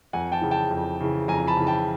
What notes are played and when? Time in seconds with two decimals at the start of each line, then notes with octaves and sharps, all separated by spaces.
0.13 F2 F#5 G#5
0.32 G5 A5
0.41 C#3 E3
0.51 G5 A5
0.71 F2
1.00 C#3 E3
1.28 F2 G#5 A#5
1.47 A5 B5
1.57 C#3 E3
1.67 G5 A5